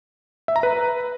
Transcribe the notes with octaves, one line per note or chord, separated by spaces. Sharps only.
E5
A#5
B4